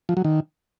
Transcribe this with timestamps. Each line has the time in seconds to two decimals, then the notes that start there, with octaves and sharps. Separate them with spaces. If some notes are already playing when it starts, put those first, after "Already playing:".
0.09 F3
0.17 F#3
0.25 D#3